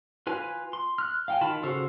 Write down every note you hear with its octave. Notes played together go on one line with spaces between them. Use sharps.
F4 B4 G#5
C6
F6 F#6
F5 G5 G#5
D#3 F4 A5 B5
C#3 F#4 A4 C5 F5